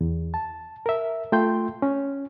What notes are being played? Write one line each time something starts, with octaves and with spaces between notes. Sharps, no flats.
E2
A5
A#4 E5
A3 F4 G5 C6 G6
C#4